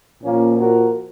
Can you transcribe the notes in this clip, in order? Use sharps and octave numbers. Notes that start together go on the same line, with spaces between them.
A#2 F3 A#3 C#4
F#4 A#4